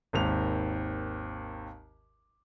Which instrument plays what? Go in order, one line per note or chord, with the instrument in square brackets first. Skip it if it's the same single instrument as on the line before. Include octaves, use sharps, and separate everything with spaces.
[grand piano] G#1 D#2 F7